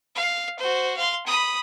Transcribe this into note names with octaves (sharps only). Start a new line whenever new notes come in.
F5
F#4 C5
F5 C6
B5 D#6